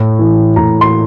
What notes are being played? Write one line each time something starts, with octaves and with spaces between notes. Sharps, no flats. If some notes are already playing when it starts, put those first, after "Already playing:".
Already playing: A2
E3
A2 A#5
C6